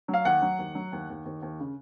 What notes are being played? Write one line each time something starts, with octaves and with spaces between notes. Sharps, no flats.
F#3
F5
D#2 F#5
F#3
D#2
F#3
D#2
D#2
D#2
D#2
C#3